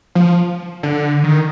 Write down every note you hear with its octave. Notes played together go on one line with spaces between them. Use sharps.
F3
D3
D#3